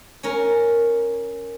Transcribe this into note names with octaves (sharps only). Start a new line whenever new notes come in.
C#4 A#4